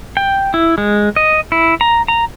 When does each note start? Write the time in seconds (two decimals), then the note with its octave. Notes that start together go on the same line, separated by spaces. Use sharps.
0.17 G5
0.54 E4
0.78 G#3
1.16 D#5
1.52 E4
1.81 A#5
2.08 A#5